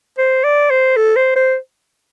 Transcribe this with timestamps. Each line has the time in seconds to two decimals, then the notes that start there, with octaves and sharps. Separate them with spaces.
0.18 C5
0.44 D5
0.70 C5
0.96 A4
1.16 C5
1.36 C5